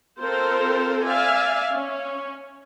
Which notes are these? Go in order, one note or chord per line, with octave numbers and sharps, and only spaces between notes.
C4 F4 A4 A#4 C5
D5 E5 F5 G#5
C#4